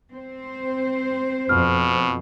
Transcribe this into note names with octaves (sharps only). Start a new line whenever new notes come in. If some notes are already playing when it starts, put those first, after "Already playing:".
C4 C5
F2 B2 F6